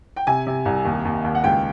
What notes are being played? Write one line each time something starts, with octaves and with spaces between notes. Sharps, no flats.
G5
C3 G#5
C3
C2
D#2
D#2
D#2
F#5
C#2 G5